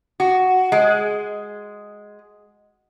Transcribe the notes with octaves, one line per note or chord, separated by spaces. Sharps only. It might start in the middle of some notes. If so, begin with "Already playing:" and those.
F#4
G#3